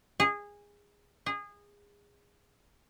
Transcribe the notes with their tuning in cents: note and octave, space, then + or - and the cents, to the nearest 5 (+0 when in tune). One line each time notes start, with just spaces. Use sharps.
G#4 -20
G#4 -25